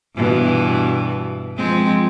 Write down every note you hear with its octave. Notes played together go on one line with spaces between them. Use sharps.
G2 B2 E3
F3 G#3 C4